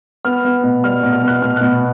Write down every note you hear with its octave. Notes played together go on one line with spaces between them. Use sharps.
B3 F6
B3
B2
G3 F6
B2
F6
B3 F#6
B2 F6
B2 F#6